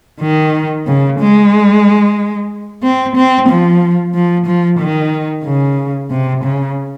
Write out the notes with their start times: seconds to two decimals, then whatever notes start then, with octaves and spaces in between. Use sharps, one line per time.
0.20 D#3
0.87 C#3
1.19 G#3
2.83 C4
3.16 C4
3.49 F3
4.14 F3
4.46 F3
4.79 D#3
5.44 C#3
6.10 C3
6.44 C#3